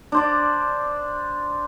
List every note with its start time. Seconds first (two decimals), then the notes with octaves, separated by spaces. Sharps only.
0.12 D4 C5 D5